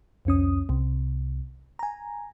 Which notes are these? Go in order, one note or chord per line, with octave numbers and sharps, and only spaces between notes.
C2 F2 C#4 D#6
C2 C3
G#5 A#5